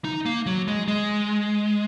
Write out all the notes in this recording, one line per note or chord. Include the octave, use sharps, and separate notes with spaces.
D#4
A#3
F#3
G#3
G#3